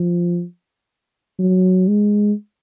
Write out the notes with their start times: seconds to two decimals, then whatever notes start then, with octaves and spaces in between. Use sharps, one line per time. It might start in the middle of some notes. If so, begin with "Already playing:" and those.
Already playing: F3
1.39 F#3
1.88 G#3